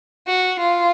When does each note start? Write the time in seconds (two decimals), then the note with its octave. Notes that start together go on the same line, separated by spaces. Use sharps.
0.28 F#4
0.59 F4